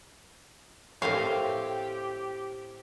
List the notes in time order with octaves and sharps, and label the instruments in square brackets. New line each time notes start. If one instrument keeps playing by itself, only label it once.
[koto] A2 C4 F5 [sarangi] G4 [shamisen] A4 A#4 C#5